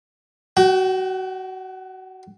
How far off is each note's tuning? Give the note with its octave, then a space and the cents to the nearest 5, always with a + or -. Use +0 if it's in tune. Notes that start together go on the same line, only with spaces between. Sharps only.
F#4 +20 G5 -25